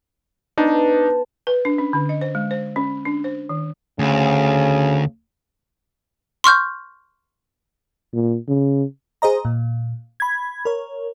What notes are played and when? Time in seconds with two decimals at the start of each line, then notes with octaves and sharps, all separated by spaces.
0.57 B3 D4 D#4 C5 A5
1.47 B4
1.65 D4
1.78 C#4
1.93 D3
2.09 D#5
2.21 C5
2.35 G#3
2.51 C5
2.76 C#4
3.05 D4
3.24 C5
3.49 D#3
3.99 D2 C#3
6.44 C6 C#6 F6 G6
8.13 A#2
8.48 C#3
9.22 G#4 C5 D#5 A#5
9.45 A#2
10.20 B5 G#6
10.65 A#4 C#5